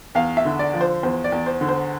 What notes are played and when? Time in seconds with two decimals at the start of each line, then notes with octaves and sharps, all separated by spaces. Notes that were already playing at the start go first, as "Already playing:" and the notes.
0.15 E2 F5
0.37 E5
0.45 D3
0.59 D5
0.74 F3
0.81 C5
1.03 E2 C5
1.24 D5
1.32 E2
1.46 C5
1.61 D3
1.69 C5